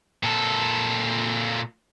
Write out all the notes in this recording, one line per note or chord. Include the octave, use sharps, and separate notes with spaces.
A#2 A4